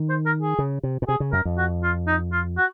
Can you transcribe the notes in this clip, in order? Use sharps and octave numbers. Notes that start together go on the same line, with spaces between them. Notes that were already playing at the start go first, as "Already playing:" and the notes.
Already playing: D#3
C5
A#4
G#4
C#3
C3
A#2
C3 G#4
C#3
F#2 A#4
F2
F#4
F4
D#4
F4
F#4